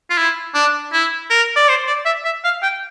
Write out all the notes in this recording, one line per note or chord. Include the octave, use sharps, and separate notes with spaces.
F4
E4
D4
E4
A#4
D5
C5
D5
E5
E5
F5
G5